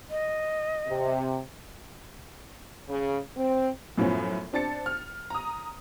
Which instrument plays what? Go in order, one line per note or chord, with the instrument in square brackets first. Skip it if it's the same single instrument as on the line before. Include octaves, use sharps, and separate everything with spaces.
[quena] D#5
[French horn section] C3
C#3
C4
[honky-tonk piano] F#2 A2 F3 B3 C#4
C4 D4 A5 A6 C#7
F6
A#5 D#6